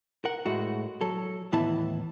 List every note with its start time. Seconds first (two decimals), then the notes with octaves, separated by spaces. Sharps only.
0.25 A#4 F#5
0.46 A2 G#3 A3 F#4
1.01 F#3 A4
1.52 D#2 A2 E3 B3 E4 A5